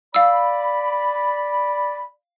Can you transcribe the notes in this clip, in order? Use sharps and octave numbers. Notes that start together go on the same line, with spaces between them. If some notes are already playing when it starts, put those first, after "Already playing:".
D5 F5 B5 E6